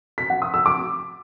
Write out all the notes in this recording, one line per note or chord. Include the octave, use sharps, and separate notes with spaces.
B6
F#5
D#6
E6
D6